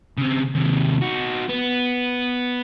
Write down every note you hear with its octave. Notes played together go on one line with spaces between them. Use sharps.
C#3 C4
D#2 C3
D#4 F#4
B3